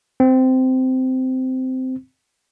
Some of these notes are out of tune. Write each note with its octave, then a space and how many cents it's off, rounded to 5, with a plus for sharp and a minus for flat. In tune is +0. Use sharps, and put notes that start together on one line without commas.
C4 -15